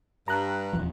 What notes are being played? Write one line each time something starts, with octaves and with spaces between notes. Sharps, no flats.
G2 A#5 F#6
D#1 E2 F3